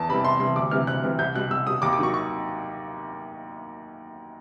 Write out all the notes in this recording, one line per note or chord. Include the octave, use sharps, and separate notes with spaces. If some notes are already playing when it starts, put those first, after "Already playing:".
Already playing: E2 A5
C3 E3 G3 B5
E2 C6
C3 E3 G3 C6
D2 D6
C3 E3 G3 F6
D2 F#6
C3 E3 G3
C2 G6
B2 G3 F#6
C2 E6
B2 G3 D#6
D#2 D6
D6
D#3 F#3 C#6
C#6